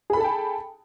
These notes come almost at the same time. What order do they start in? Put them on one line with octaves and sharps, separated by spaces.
G#4 B5 A4 A5 G5